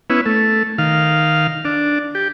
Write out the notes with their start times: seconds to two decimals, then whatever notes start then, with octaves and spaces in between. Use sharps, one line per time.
0.10 B3 C#4 E4
0.26 A3
0.78 D#3 F5
1.65 D4
2.15 G4